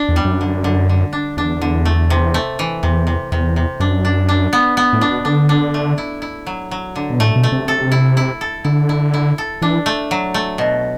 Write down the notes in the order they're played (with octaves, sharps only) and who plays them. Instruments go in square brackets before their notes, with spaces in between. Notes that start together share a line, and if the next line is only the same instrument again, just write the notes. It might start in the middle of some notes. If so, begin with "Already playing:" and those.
Already playing: [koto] D4
[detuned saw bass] E2
[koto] G3
[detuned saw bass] F#2
[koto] D3
D3
D3
D4
[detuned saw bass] E2 [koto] D4
[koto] D3
A3
C3
A3
E3
[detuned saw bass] E2 [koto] C3
[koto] C3
[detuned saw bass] E2 [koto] C3
[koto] C3
[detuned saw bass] F#2 [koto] D4
[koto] D4
D4
B3
B3
[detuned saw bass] A2
[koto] D4
[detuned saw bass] B2
[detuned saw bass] D3 [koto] D4
[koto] D4
A3
E4
E4
F#3
F#3
D3
[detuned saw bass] B2
[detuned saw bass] A2 [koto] A3
[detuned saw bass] B2
[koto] A3
[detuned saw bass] C3
[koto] A4
E4
E4
A4
[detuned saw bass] D3 [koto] E4
[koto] E4
E4
A4
[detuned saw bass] E3 [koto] D4
[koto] A3
F#3
A3
B2